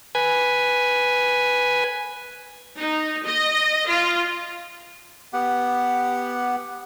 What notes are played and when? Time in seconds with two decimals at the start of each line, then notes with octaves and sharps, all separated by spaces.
0.15 B4 G#5
2.78 D#4
3.26 D#5
3.88 F4
5.33 B3 G4 F#5